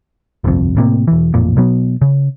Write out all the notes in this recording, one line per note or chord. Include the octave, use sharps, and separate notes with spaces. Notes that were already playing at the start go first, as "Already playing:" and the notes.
G1 C2 F2
A2 C3 A#3
E1 E3
A1 F2 A#2
B2 F#3 B3
C#3